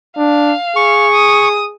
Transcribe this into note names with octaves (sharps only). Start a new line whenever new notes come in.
D4 F5
G#4 C#6
D#6